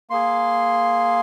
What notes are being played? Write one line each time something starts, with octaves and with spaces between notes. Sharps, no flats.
A#3 G#4 C6